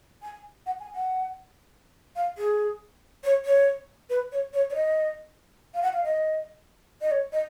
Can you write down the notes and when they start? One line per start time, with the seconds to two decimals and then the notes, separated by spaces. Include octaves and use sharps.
0.22 G#5
0.66 F#5
0.80 G#5
0.95 F#5
2.16 F5
2.38 G#4
3.24 C#5
3.45 C#5
4.10 B4
4.32 C#5
4.53 C#5
4.70 C#5
4.74 D#5
5.74 F5
5.82 F#5
5.93 F5
6.04 D#5
7.01 D#5
7.11 C#5
7.32 D#5